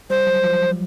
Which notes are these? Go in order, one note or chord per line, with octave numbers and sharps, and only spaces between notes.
G3 C5
F#3
F3